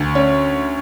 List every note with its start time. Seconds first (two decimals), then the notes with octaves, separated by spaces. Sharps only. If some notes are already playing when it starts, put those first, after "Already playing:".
Already playing: D2
0.15 C#4